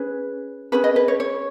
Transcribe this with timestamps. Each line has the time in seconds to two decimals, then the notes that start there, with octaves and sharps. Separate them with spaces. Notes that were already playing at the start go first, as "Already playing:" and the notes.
Already playing: C#4 G#4 B4
0.72 C#4 G#4 B4 B5
0.84 D#5
0.96 B4
1.08 C#5
1.20 C#5